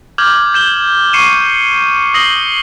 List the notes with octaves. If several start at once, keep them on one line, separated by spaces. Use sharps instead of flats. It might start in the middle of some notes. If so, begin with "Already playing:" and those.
D6 F6 G6 G#6 F#7
G6 E7 G7
C#6 C7 C#7 D#7 E7
D#6 A#6 C7 F#7 G7